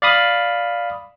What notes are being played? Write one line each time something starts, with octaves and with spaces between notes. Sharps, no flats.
D5 F5 B5 D#6